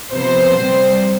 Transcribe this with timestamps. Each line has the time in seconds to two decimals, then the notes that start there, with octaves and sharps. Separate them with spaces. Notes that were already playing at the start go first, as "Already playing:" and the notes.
0.14 C3 F3 B3 C5
0.59 C3 G3 C4